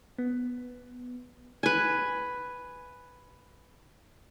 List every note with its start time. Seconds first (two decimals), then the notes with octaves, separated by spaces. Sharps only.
0.18 B3
1.63 B4 G#5